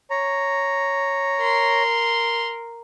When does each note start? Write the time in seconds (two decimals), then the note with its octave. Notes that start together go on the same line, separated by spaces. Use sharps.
0.10 C#5 A#5
1.37 A#4 C6